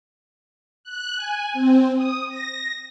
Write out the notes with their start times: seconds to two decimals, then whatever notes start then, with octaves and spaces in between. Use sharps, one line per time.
0.84 F#6
1.17 G#5
1.53 C4
1.96 D#6
2.29 A#6